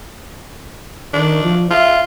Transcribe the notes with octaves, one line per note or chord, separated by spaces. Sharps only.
D#3 D4
F3
F4 E5